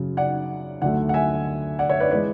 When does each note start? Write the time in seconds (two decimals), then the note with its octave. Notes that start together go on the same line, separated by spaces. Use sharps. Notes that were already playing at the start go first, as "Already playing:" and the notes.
Already playing: F#2 C#3 F#3
0.17 D5 F#5
0.81 D2 D3 F#3 A3 D5 F#5
1.09 F#5
1.14 E5 G#5
1.79 D5 F#5
1.89 C#5 E5
2.00 B4 D5
2.11 E3 G#3 B4 D5